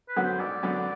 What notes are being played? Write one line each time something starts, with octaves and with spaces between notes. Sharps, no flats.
B4
F#2 D3 F#3 B3
C5
G#1 D5
F#2 D3 F#3 B3